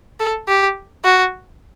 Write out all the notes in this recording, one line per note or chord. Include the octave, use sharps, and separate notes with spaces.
A4
G4
F#4